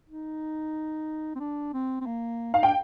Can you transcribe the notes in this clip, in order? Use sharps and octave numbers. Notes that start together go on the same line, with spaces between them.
D#4
C4
D4
C4
C4
A#3
D#4 F5
D4 G5